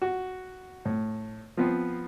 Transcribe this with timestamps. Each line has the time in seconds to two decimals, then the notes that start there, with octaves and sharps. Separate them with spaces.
0.02 F#4
0.85 A2
1.57 F3 B3 C4